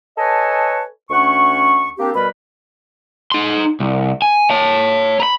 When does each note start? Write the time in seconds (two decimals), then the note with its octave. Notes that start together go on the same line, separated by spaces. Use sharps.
0.18 A4 B4 C#5 D#5 G#5 A5
1.10 D2 C#4 F#5 C#6
1.98 A#3 C4 D4 G4
2.15 B2 G3 A#4 B4 B5
3.32 D#4 C6
3.80 C2
4.22 G#5
4.50 C#5 A5
5.20 A#5 B5